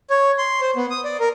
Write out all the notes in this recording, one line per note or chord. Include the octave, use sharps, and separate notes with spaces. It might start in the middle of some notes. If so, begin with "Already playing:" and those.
C#5
C6
C5
B3
D#6
D5
A#4